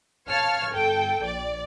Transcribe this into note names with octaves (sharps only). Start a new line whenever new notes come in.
C#5 F5 A5 C#6 F6 G#6
G1 A4 G5
A#1 D5